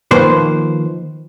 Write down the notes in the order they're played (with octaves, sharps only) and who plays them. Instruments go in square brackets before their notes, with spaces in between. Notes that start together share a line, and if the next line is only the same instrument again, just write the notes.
[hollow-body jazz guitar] D#3 F3 A#3 B4 C5